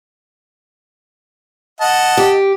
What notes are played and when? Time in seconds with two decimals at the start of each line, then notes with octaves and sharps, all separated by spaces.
1.81 D#5 F#5 A5
2.17 G4